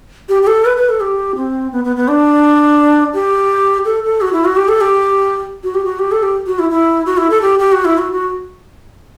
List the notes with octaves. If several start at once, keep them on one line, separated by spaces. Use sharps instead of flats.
G4
G4
A4
B4
B4
A4
G4
C4
B3
B3
B3
D4
G4
A4
A4
F#4
E4
F#4
G4
A4
G4
F#4
G4
F#4
G4
A4
G4
F#4
E4
E4
F#4
E4
A4
G4
G4
F#4
E4
F#4
F#4